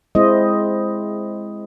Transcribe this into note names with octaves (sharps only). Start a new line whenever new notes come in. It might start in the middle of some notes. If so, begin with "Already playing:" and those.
G#3 C4 E4 C5 D#5